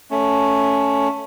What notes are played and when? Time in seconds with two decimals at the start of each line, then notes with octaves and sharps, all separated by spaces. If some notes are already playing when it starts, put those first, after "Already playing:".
0.11 A3 C#4